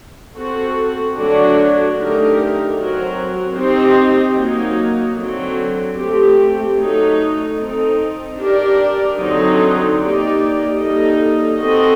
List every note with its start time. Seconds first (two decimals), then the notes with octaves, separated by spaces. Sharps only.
0.34 C4 F#4 A4
1.13 D3 F#3 A3 D4 F#4
1.94 D3 A3 D#4 G4 A#4
2.75 F#3 C4 F#4 A#4
3.54 C4 D#4 G4 C5
4.35 F#3 A#3 D#4
5.15 D3 F#3 C4
5.96 A3 C4 G4
6.77 F#3 A3 D#4
7.56 C4 D#4 A4
8.37 D4 G4 A#4 D5
9.17 D3 F#3 C4 D#4
9.98 A#3 D#4 G4 D5
10.77 G3 A#3 D#4 A4 D#5
11.58 C4 F#4 A4 D#5